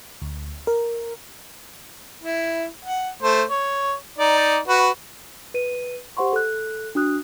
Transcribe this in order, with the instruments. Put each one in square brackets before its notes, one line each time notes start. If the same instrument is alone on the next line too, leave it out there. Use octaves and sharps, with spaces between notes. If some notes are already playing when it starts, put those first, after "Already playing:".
[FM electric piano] D2
A#4
[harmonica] E4
F#5
A3 C5
C#5
D#4 D5
F#4 B4
[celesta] B4 D#7
G4 C5 F#5 C6 C#6
A4 F#6
D4 F#4 D#6 F#6